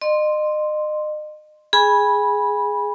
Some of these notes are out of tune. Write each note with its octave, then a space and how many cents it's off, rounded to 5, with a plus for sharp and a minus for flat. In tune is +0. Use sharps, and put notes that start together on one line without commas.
D#5 -35 C6 +0
G#4 +0 G#5 -25 B5 -15